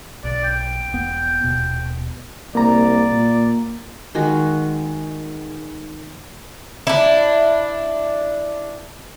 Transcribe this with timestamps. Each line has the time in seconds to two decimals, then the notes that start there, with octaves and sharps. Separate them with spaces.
0.24 B1 D5
0.44 G5
0.93 E1 B3
1.43 D#1 B2
2.55 C2 A#3 D5 A#5
3.10 A#2
4.15 D#3 G#3 F#4
6.87 D4 E4